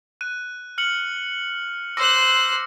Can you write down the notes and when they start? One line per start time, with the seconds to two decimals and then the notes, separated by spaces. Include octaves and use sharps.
0.21 F#6 D#7
0.78 F6 C#7 F#7
1.97 C5 D6 E6 F#6 A#6